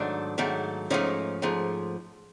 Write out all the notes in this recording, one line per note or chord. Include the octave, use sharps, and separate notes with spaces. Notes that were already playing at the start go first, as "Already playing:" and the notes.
Already playing: G#2 D#3 F#3 A3 D4
G#2 D#3 F#3 A3
G#2 F3 A3 C#4 D#4
G#2 F3 A3